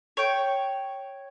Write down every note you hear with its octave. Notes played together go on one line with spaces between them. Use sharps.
C#5 G5